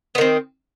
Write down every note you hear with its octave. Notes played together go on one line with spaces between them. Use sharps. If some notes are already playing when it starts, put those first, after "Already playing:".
D#3 B3 C4